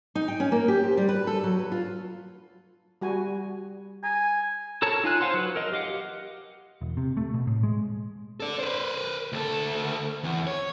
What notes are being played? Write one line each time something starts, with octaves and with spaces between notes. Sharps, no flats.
D#4
G5
C#4
A#3
G4
C5
G3
B4
A4
F#3
B4
F4
G3 F#4 G#5
G#5 A#5
A4 A#4 C#5 A5
D#4 F4 G#5 F#6
C5 C#5 F5 F#5 C6
F#3 B4
A#4 D#5
G4 D#5 F5 F#5
E1
C3
A3
B2
A2
G#3
A4 D5
B4 C5
D2 A4
E2
C#5